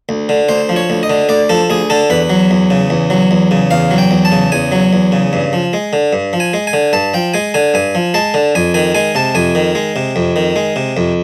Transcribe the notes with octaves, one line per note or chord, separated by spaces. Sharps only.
D2
D3
D2 C5
F3
C#5
D2
D#5
D3
D2 D5
F3 A4
D2 G#4
D3 A4
E2 B4
F#3
E2
C#3
E2
F#3
E2
C#3
E2 F5
F#3
G5
E2
A5
C#3
E2 G#5
F#3
E2
C#3
G2
F3
G#3
D3
G2
F3
G#5
G#3
G#5
D3
G2 A5
F3 G5
G#3 G#5
D3 G#5
G2 G#5
F3
G#3 A5
D3
F2 G#5
D#3 G#5
G#3 G#5
C3 A5
F2 G#5
D#3
G#3
C3
F2
D#3
G#3
C3
F2